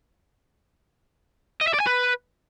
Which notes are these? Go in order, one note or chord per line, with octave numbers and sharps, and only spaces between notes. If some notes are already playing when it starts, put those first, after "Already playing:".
D#5
E5
D5
G#5
B4